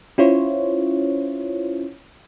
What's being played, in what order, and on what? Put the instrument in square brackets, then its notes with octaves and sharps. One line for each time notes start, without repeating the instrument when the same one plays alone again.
[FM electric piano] C#4 E4 F4 C5 C#5